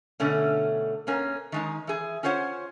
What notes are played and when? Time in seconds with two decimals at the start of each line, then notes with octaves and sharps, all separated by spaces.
0.20 B2 D3 A3 C#4
1.07 A#3 B3 C#4 A#4
1.52 D#3 G#3 D#4
1.87 E3 G#4
2.23 C#4 F4 C5 C#5 F5 F#5